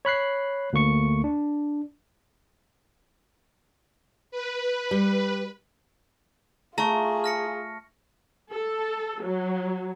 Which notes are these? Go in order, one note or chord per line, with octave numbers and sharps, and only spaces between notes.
C#5 B5 F#6 C7
D2 A#3 C#6 C#7
D4
B4
G3
A3 F4 G#4 A5 A#5 C#6
F6 A#6 C#7
A4
F#3